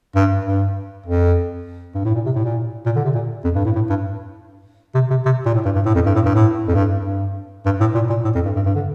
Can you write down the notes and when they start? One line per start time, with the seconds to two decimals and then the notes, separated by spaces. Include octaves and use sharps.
0.15 G2
0.45 G2
1.06 F2
1.95 G2
2.05 A2
2.14 A#2
2.26 C3
2.36 A2
2.44 A#2
2.86 A#2
2.96 D3
3.05 C3
3.15 A#2
3.44 F2
3.55 G2
3.65 A2
3.76 A2
3.89 G2
4.95 C3
5.10 C3
5.26 C3
5.45 A#2
5.55 A2
5.65 G2
5.75 G2
5.85 A2
5.95 F2
6.06 G2
6.15 A2
6.25 G2
6.35 A2
6.68 F2
6.75 G2
7.05 G2
7.65 G2
7.81 A2
7.94 A#2
8.10 A#2
8.24 A2
8.35 F2
8.45 G2
8.55 G2
8.66 G2
8.75 D3